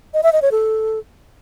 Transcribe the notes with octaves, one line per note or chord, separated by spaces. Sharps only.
D#5
E5
D#5
C#5
A4